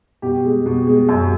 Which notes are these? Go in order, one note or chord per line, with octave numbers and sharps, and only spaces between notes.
B2 G4
G#3
B2
G#3
F#2